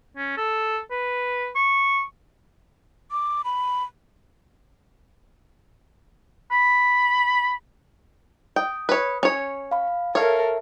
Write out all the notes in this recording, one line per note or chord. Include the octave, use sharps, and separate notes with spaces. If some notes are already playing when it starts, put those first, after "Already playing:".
C#4
A4
B4
C#6
D6
B5
B5
G5 D#6
B4 C#5
C#4 C#5
F5 B5
A4 A#4 C#5 E5 F5